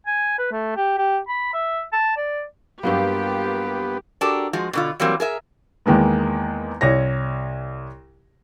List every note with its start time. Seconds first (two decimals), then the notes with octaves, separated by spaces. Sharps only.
0.07 G#5
0.38 B4
0.52 A3
0.77 G4
0.98 G4
1.28 B5
1.54 E5
1.93 A5
2.17 D5
2.83 G2 F#3 A#3 B3 F4 G4 A#4 F5
4.21 D4 F#4 G4 A4 A#4
4.53 F3 G#3 F#4
4.73 B2 D3 F4
5.00 E3 F#3 G3 A#3 C4
5.20 G#4 A#4 E5
5.86 E2 D#3 G#3 A#3 B3
6.81 C2 C#5 A#6